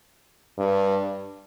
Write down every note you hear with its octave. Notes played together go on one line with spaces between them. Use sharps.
G2